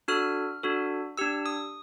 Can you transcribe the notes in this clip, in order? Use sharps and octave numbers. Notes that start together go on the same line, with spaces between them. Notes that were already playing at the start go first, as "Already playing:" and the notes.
D4 F#4 A4 F6
D4 F#4 A4
D4 G4 E6
D#6